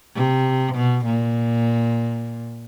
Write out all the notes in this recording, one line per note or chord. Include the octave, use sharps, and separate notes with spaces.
C3
B2
A#2